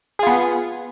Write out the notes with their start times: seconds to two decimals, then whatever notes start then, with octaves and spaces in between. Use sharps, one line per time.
0.19 G#4
0.23 F4
0.27 B3